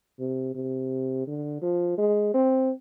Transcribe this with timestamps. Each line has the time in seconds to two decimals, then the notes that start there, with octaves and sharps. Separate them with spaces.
0.19 C3
0.55 C3
1.27 D3
1.62 F3
1.98 G#3
2.34 C4